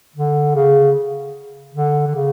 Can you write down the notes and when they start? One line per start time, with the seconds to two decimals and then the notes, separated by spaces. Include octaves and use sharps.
0.16 D3
0.55 C#3
1.74 D3
2.07 D3
2.15 C#3